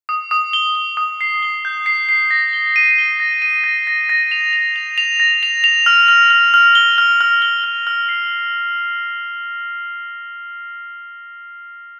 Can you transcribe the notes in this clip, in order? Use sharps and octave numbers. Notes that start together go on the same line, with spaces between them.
D#6
D#6
G7
G7
D#6
C7
G7
G6
C7
C7
A#6
G7
D#7
G7
A#6
D#7
A#6
A#6
A#6
F7
F7
F7
F7
A#6
F7
F7
F6
F6
F6
F6
G7
F6
F6
G7
F6
F6
C7